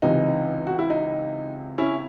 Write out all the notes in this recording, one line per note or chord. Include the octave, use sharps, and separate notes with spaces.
C#2 C3 E3 D#4
F#4
E4
D#4
C#4 E4